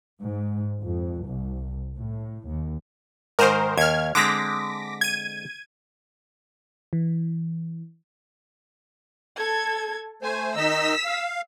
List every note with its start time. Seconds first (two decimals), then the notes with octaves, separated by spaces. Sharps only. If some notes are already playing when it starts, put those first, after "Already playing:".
0.21 G#2
0.82 F2
1.23 C2
1.95 A2
2.47 D#2
3.39 G#2 D#3 A#4 C5
3.78 D#2 F6 G#6
4.15 D3 G#3 C4 D6 A#6 B6
5.01 G#6 D#7
6.93 E3
9.37 A4 G#6
10.22 A3 C5 G#5
10.56 D#3 D#4 D#5 E6 B6
11.05 F5